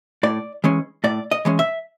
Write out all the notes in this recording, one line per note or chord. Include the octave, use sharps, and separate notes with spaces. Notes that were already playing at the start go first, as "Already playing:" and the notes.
A2 D5
E3 G#3 C#4
A2 D5
D#5
E3 G#3 C#4
E5